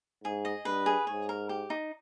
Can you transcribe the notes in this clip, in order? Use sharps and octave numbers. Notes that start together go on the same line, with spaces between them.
G#2 G#4
D#5
G2 B4
G#4
G#2 C#5
A#4
G4
D#4